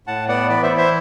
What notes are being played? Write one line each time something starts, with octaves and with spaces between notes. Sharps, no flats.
A2 F#5 A5
B3 D5 F#5
E3 B4 D5
C5 E5
E4
C5 E5